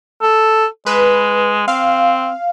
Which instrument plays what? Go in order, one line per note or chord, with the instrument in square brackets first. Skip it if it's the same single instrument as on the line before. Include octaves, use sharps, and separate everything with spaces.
[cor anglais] A4
[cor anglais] G#3 [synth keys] B4
[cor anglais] C4 [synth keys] F5